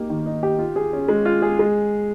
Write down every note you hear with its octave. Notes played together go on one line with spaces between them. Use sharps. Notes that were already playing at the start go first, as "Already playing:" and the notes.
Already playing: A#3 D#4 G4
D#3
D#4
G4
F4
G#4
C#4
G#3
F4
G#4
G#3